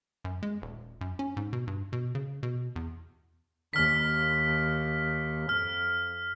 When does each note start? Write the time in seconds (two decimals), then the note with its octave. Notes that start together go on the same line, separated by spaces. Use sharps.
0.25 F#2
0.43 G#3
0.62 D#1
1.01 F#2
1.19 C#4
1.37 G#2
1.53 B2
1.67 G2
1.93 B2
2.15 C#3
2.43 B2
2.76 E2
3.73 D#2 F6 B6
5.49 F2 F6